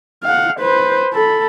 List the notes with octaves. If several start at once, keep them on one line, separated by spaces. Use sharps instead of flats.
F5 F#5
B4 C5
A4 B5